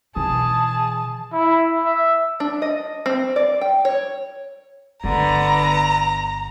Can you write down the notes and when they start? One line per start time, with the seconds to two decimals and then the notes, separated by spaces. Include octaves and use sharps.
0.16 B2 E3 G#4 A5
1.33 E4
1.85 E5
2.40 D4
2.62 D#5
3.06 C4
3.36 D5
3.61 G5
3.85 C#5
5.04 G1 D3 B3 A#5